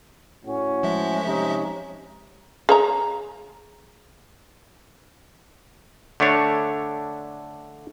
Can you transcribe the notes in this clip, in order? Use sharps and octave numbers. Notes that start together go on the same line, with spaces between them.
A2 C#4 F#4
F3 G#3 E5
C3 C#4 D#4
G#4 C#5 A#5
D3 A3 D4 C#5